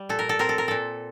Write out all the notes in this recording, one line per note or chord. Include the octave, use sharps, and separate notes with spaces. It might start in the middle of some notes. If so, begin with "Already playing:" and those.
Already playing: G3
A#2 A4
A#4
A4
C4 A#4
A4
A#4
A#2 A4